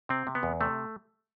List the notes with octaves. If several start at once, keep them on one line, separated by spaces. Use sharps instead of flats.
C3 C4
C3
B3
E2
C3 A3